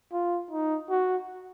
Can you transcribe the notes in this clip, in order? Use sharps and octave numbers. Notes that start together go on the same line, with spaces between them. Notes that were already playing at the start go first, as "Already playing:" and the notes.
F4
D#4
F#4